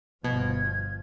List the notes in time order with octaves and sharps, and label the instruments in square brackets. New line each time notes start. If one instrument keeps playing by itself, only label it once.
[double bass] G1 F3 [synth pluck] B2 [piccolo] G#6